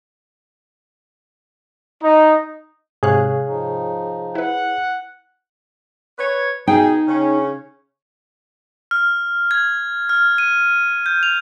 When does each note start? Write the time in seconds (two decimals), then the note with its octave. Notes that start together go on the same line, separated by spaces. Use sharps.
2.03 D#4
3.03 G#2 C3 G#4 C#5 F5 F#6
3.48 F3 D#4
4.35 E4 B4 F#5
6.18 B4 C#5
6.67 B2 D#4 G#4 G5
7.07 C#3 C#4
8.91 F6
9.51 G#6
10.09 F6
10.38 D#7
11.06 G6
11.23 F7